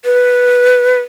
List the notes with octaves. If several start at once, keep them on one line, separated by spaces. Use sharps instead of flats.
B4